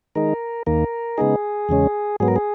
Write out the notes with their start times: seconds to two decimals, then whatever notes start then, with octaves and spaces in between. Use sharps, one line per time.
0.15 D#3 G#3 D#4 A#4
0.66 D#2 D#3 A#3 A#4
1.18 C#3 G#3 B3 D#4 G#4
1.69 E2 C#3 G#3 C#4
2.20 G#2 F#3 B3 G#4
2.28 A#4
2.36 G#4